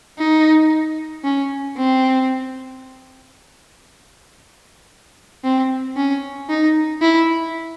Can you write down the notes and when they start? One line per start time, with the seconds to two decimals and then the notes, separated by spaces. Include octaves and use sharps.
0.18 D#4
1.24 C#4
1.77 C4
5.44 C4
5.97 C#4
6.49 D#4
7.01 E4